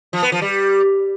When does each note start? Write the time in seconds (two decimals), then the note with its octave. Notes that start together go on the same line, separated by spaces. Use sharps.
0.13 F3
0.23 B3
0.32 F3
0.42 G3